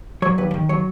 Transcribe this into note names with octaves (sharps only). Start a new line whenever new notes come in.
F#3 C#5
D#2 B4
D#3
F#3 C#5